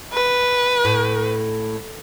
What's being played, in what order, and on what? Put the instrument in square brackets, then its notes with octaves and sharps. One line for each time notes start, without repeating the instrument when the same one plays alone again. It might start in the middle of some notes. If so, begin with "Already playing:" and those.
[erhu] B4
[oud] A2